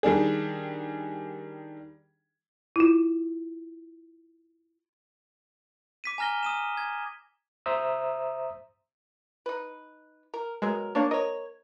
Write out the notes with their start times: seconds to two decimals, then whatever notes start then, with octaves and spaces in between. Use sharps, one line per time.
0.03 D#3 G3 D4 G#4
2.76 E4 F4
6.04 D6 B6 D#7
6.18 G#5 A#5 F6 A#6 G7
6.43 D#6 D#7 E7
6.77 G#6
7.66 C5 E5 A#5 D#6 E6
9.46 D#4 B4
10.34 A#4
10.62 B2 F#3 G#3 A#4
10.95 A#3 D4 C#5
11.11 A#4 C#5 D#5